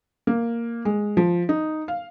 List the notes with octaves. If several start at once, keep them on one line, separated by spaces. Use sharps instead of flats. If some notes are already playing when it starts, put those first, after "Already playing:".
A#3
G#3
F3
D#4
F5